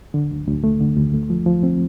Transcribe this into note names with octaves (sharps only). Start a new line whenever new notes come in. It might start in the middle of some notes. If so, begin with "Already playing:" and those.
D3
D2
D2
A3
D3
D2
A3
F3
F3
C4